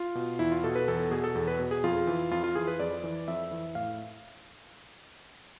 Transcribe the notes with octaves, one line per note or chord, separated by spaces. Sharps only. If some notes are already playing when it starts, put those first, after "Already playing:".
Already playing: F4
B2
E2 E4
F4
B2 A4
B4
E2 A4
B2 G#4
A4
E2
B4
B2
G#4
F2 F4
E3
F2 F4
F4
E3 G#4
B4
F2 D5
E3
F2 E5
E3
A2 F5